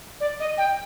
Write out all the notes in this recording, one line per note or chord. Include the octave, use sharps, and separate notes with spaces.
D5
D#5
G5